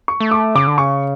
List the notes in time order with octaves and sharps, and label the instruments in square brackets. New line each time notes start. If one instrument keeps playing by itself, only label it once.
[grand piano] C#6
[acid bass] A3
[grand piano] D6
[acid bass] C#3 [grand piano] D6
[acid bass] D3
[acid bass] C#3 [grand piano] C#6